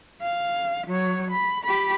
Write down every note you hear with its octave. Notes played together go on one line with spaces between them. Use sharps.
F5
F#3 C#5
B5
G4 B5